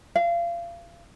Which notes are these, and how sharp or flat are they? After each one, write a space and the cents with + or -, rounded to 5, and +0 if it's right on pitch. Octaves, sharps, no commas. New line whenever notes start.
F5 -30